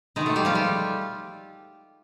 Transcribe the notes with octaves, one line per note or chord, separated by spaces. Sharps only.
B2 D#3 G#3 D#4
A3 A4
G3 G4
F3 F4
G3 G4